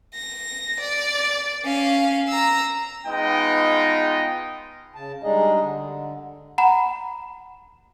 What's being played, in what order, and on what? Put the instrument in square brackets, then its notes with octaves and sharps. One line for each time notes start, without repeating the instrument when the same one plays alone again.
[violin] A#6
D5
C#4 F5
A#5 E6
[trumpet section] G#3 B3 D#4 F4 D#5 G5
[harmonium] C#3 A5
G3 G#3 D4 D#4 G#4 D#5
D3
[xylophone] F#5 A#5 B5